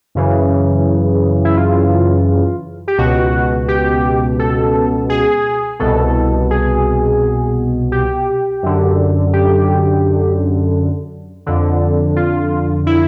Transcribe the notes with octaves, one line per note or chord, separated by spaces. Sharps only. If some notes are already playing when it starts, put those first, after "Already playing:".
F#2 C#3 E3
E4
F4
G4
C#2 B2 F#4
G4
A4
G#4
C2 B2 A4
G#4
G4
F#2 D3
G4
F2 D3
F4
E4